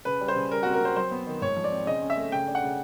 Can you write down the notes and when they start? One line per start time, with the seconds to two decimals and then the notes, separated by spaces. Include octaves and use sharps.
0.05 C#3 B4
0.21 G3
0.28 C5
0.36 C#3
0.51 G3 A#4
0.63 C4 F#4
0.73 A#4
0.81 C4 C5
0.96 F#3 C5
1.11 B3
1.27 D#3
1.42 G#2 C#5
1.56 F3
1.64 D5
1.72 C4
1.87 C#3 D#5
2.02 C#4
2.10 E5
2.17 A3
2.32 C#3 G5
2.48 D4
2.55 F#5
2.62 C#3